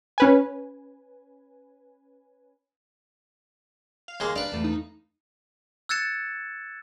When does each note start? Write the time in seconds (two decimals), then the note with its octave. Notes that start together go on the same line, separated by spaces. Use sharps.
0.18 C#4 B4 G#5
4.08 F5
4.20 D#2 G#3 A#3
4.36 D4 B4 D5 F5
4.52 E2 A3
4.64 D#4
5.89 E6 F#6 G#6 A6 C#7 E7